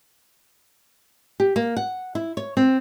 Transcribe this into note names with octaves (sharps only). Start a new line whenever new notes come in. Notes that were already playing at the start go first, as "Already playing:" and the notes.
G4
A#3
F#5
E4
C#5
C4